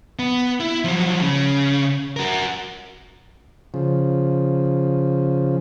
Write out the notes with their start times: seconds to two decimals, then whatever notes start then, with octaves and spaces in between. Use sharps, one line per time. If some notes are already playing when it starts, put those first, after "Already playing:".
0.19 B3
0.60 E4
0.84 F3 F#3
1.22 C#3
2.17 F#4 A#4
3.74 C#3 F3